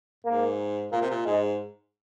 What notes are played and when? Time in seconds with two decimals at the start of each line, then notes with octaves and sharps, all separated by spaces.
0.24 G#2 A#3
0.92 A#2 A#3
1.01 C3
1.10 A#2
1.25 G#2 G#3